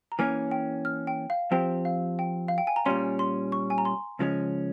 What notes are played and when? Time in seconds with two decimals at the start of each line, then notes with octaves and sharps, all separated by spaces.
0.12 A#5
0.19 E3 A#3 C#4 G#5
0.51 G5
0.85 F6
1.07 G5
1.30 F5
1.51 F3 C4 G4 C5 G5
1.85 F5
2.19 G5
2.48 F5
2.58 G5
2.67 G#5
2.76 A#5
2.86 A#2 G3 C#4 C6
3.19 C6
3.52 C#6
3.70 G#5
3.78 A#5
3.85 C6
4.19 C#2 C#3 F3 G#3 C#4